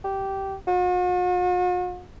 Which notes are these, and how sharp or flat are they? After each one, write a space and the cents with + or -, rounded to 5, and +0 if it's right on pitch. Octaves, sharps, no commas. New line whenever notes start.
G4 -15
F#4 -45